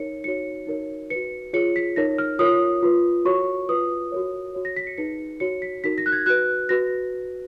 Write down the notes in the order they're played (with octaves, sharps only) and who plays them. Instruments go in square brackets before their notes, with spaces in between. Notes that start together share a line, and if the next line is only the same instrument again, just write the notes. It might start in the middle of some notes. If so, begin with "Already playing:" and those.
Already playing: [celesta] D#4 A#4 C#5 C#7
D#4 F#4 C#5 C#7
D#4 F#4 A#4 C#5
B4 C#7
F#4
F4 G#4 C#5 C#7
B6
D#4 A#4 C#5 A#6
F6
F4 A#4 C#5 D#6
F4 B4
F#4 A#4 C#5 C#6
F4 B4 D#6
F#4 A#4 C#5
F#4 C#5
A#6
B6
C#7
D#4 G#4 B4 C#7
F#4 C#5 C#7
B6
D#4 F#4 A#4 B6
A#6
F#6
G#6
F#4 B4 F#6
F#4 B4 A#6